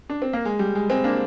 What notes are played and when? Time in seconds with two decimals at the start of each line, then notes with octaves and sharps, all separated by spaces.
0.10 D4
0.22 C4
0.33 A#3
0.45 G#3
0.59 G3
0.75 G#3
0.90 G#3 C4
1.04 A#3 D4